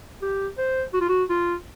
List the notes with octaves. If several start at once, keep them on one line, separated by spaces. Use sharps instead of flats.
G4
C5
F#4
F4
F#4
F4